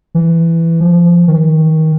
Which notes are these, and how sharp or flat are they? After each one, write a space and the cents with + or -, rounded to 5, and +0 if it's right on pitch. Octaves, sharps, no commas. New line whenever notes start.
E3 +10
F3 -20
D#3 +25